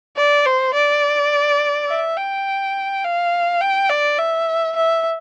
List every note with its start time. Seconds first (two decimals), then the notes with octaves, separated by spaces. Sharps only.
0.17 D5
0.46 C5
0.74 D5
1.89 E5
2.18 G5
3.04 F5
3.61 G5
3.90 D5
4.19 E5
4.76 E5